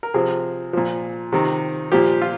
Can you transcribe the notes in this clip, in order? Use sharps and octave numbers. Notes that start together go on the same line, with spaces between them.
A#4
C3 F3 G#4
A#2 F3
C3 D#3
A#2 F3 G4
F4